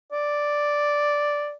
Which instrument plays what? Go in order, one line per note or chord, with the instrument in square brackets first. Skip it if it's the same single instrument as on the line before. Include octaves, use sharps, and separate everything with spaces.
[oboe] D5